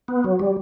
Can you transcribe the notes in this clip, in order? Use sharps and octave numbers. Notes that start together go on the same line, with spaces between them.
B3
F#3
G3